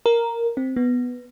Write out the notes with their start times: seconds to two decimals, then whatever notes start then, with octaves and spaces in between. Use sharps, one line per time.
0.06 A#4
0.57 C4
0.76 B3